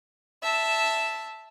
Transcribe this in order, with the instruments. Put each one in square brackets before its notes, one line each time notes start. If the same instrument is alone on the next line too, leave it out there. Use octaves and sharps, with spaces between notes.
[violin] E5 A5